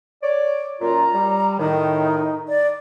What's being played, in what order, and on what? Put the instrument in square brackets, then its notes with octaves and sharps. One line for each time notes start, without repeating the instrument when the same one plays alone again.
[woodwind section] C#5 D5
[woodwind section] F#2 A#2 F4 [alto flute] A#5
[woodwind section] G3
[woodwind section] A2 D#3 [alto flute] D#4
[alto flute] D5